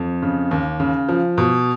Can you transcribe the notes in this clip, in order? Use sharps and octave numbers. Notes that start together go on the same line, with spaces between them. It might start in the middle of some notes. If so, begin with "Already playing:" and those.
Already playing: F2
C#3
D#2
C#3
F3
B2